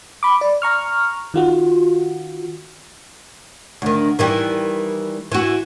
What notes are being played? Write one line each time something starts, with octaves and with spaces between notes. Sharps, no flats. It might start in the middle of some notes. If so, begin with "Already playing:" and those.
B5 D6
D5
A#5 C#6 F6
D#3 F4 F#4
D2 D#3
D#3 E3 G3
E3 F#4